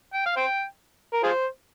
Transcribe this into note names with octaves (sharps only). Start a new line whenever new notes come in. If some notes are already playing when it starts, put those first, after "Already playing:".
G5
F5
C5 G5
A#4
F4 G#4 C5